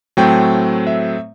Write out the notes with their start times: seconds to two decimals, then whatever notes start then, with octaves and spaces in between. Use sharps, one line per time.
0.17 A2 F#3 A3 C4 G5
0.87 E5